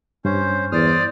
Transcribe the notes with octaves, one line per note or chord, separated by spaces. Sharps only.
G2 C#4 C5
E2 C5 D5 D#6 F6